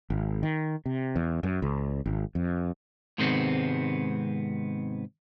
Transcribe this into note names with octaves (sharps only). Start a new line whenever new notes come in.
G#1
D#3
C3
E2
F#2
C#2
G#1
F2
G#2 C3 D#3 G#3 B3 C4